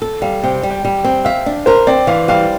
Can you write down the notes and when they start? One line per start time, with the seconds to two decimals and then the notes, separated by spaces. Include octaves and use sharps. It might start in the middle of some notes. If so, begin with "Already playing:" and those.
0.02 A4
0.22 G3 F5
0.44 C3 G5
0.63 G3
0.70 G5
0.85 G3
1.04 C4
1.25 E5 F5
1.46 D4
1.66 A#4 C5
1.87 C4 D5
2.07 E3 F5
2.28 G3 F5